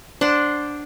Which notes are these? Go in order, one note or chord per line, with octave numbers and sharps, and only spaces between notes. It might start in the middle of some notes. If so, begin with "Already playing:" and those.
D4 C5 F#5 C6